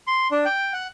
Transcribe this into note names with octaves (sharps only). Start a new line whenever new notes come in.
C6
D4
G5
F#5